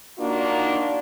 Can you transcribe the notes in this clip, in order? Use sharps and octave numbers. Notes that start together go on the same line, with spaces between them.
A#3 D4 D#4 F4 F#4